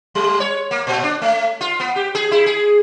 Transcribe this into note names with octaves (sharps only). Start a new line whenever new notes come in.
G3
C#5
A#3
A#2
D4
A3
F4
B3
G4
G#4
E4
G#4